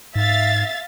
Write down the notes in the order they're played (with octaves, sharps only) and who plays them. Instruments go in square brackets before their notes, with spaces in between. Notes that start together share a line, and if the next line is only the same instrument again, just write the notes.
[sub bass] G#2 [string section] E5 F5 A6